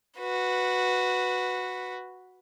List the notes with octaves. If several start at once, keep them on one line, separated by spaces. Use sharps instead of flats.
F#4 B4